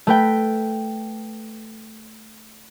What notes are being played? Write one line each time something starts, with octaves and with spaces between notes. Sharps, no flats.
A3 B4 G5